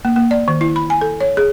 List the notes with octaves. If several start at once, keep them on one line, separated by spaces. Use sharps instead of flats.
A#3
A#3
D5
D#3
E4
B5
G#5
A4
C#5
G#4